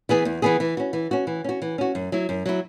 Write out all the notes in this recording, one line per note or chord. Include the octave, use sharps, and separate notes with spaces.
E3 B3 G#4
E2
E3 B3 G#4
E3
C#4 F#4
E3
C#4 F#4
E3
C#4 F#4
E3
C#4 F#4
F#2
F#3 E4
F#2
F#3 E4